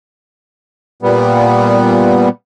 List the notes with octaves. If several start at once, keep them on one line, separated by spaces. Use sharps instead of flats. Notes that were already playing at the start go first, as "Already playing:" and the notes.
A#2 G3 B3